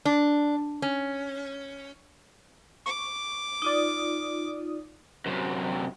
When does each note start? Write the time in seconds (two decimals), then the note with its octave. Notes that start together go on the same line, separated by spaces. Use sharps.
0.05 D4
0.82 C#4
2.86 C#6 D6
3.62 D#4 F4 D5 D#6
5.26 F#2 C3